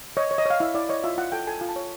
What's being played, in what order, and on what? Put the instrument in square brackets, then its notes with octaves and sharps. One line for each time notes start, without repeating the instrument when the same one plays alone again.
[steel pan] C#5 D#5
C#5
D#5
C#5 F5
E4 E5
E4 D5
C#5 D#5
F4 E5
F4 F#5
A4 G5
A4 G#5
F4 G#5
A5
C#5